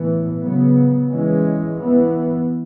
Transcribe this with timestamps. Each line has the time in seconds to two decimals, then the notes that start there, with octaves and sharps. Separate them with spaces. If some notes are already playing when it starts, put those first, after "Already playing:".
Already playing: A2 E3 B3
0.42 C#3 F#3 B3
1.10 E3 G#3 C#4
1.78 E3 B3